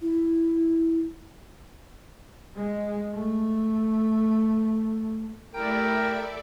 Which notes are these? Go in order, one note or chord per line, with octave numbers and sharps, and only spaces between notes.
E4
G#3
A3
A3 E4 G4 A4 A#4 D5 E5 G5